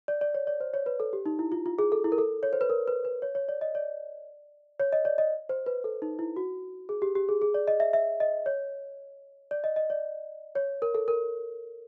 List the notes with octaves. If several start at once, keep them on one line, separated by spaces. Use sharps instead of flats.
D5
D5
C#5
D5
C5
C#5
B4
A4
G4
D#4
E4
F4
F4
G#4
A4
E4
A#4
A4
C#5
C5
B4
A#4
B4
B4
C#5
C#5
D5
D#5
D5
C#5
D#5
D5
D#5
C5
B4
A4
D#4
E4
F#4
G#4
G4
G4
G#4
G#4
D5
D#5
E5
E5
D#5
C#5
D5
D#5
D#5
D5
C#5
A#4
A4
A#4